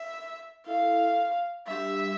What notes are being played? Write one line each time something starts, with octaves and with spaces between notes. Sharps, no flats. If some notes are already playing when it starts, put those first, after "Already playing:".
Already playing: E5
E4 A4 E5 F5
G3 D4 G4 E5